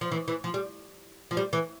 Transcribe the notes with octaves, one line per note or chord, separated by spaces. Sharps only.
F3
E3
E3
F3
G3
F3
G3
E3